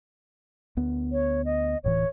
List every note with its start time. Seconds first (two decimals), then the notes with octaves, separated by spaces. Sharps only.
0.77 D2 B3
1.12 C#5
1.45 D#5
1.84 D1 A2 E3 C#5